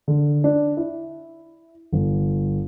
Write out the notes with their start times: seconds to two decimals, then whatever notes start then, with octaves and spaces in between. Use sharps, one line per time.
0.08 D3
0.44 D4
0.77 E4
1.92 G1